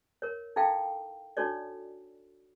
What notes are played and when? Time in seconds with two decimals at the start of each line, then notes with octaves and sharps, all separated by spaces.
0.22 A#4 C#5
0.56 D#4 E4 A4 F5 G5
1.37 D4 D#4 F#4 A4 C#5 D5